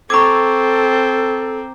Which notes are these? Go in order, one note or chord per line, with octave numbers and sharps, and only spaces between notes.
C4 A4 A#5 C#6 D6 E6 G#6